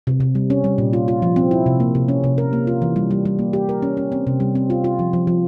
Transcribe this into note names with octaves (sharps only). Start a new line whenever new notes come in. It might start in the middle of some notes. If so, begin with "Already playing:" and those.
C3
C3
G3
C#4
G3
A#2
F4
F4
F3
C4
E4
C3
A#3
C3
C#4
C3
A#4
A#3
F4
E3
G3
G3
G3
A#3
G4
A#4
C#4
C#4
C4
C3
G3
C4
F4
F4
F3
F3
F3